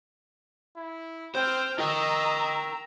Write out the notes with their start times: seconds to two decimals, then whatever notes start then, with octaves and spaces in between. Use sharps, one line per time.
0.77 E4
1.35 C4 C5 G5 F6
1.80 A#4 D#5 G5 A#5 E6